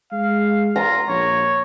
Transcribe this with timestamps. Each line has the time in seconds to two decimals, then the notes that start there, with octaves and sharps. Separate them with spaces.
0.12 G#3 F5
0.76 F4 A#5
1.08 A#1 C#5